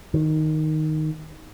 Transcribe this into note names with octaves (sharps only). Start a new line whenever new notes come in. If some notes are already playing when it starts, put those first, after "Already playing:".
D#3